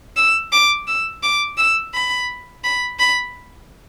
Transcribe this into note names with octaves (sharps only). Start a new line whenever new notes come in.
E6
D6
E6
D6
E6
B5
B5
B5